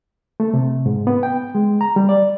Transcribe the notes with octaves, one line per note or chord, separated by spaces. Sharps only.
A3
C3
G#2
B3
G5
G#3
A#5
G3
D5